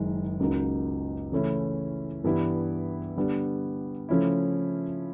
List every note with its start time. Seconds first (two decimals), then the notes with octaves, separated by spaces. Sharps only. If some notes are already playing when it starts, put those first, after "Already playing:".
Already playing: F#1 F#2 D#3 G#3
0.40 C#2 C#3 F#3 A#3 D#4
1.32 C#3 E3 A3 C#4 E4
2.24 G2 E3 G3 B3 E4
3.17 D3 G3 B3 D4
4.09 C#3 F3 A3 C#4 E4